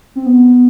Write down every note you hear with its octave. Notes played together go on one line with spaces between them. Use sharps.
C4
B3